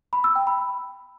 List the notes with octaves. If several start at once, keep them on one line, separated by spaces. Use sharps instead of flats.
B5
E6
G5
B5